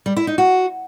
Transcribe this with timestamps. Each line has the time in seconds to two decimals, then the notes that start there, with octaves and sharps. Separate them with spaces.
0.06 G3
0.16 E4
0.27 D#4
0.38 F#4